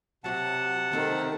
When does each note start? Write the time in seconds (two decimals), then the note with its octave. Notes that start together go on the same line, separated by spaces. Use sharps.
0.24 C3 F#3 F#4 F#5 A5
0.92 D#3 G3 C4 A4